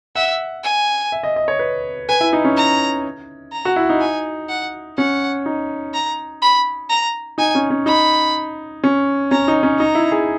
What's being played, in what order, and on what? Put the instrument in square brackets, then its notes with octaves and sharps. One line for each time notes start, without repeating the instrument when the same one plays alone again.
[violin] E5 [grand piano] F#5
[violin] G#5
[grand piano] E5
D#5
D#5
C#5
B4
[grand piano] B4 [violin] G#5
[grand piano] E4
D#4
C#4
[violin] A#5
A#5
[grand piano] F#4
E4
D#4
[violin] G#5
F#5
[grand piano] C#4 [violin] F#5
[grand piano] D#4
[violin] A#5
B5
A#5
[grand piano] D#4 [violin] G#5
[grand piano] C#4
C#4
[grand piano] D#4 [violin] B5
[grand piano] C#4
[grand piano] C#4 [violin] A#5
[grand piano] D#4
C#4
[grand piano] D#4 [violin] A#5
[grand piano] E4
G#4